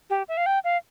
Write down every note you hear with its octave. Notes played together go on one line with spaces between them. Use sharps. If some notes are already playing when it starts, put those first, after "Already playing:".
G4
E5
F5
G5
F5